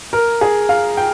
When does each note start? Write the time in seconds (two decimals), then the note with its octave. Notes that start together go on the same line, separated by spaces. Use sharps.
0.13 A#4
0.41 G#4
0.69 F5
0.97 G5